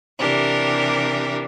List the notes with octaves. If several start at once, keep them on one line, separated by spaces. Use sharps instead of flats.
C3 E3 D4 G4 A#4